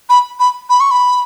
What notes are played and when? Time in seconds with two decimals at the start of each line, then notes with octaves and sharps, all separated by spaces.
0.09 B5
0.40 B5
0.69 B5
0.80 C#6
0.91 B5